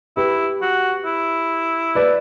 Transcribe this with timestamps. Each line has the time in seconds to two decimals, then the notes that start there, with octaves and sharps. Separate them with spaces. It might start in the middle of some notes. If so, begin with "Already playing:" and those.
0.17 E4 G4 B4
0.62 F#4
1.06 E4
1.95 B4 D5